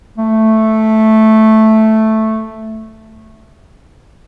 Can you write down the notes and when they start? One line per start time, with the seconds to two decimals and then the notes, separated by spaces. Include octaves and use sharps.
0.18 A3